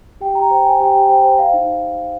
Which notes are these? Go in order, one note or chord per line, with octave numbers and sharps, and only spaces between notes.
G4 G5
G4 A#5
C5 G5
C5 G#5
G4 G5
G4
C5 G5
C5
C5 F5
D#4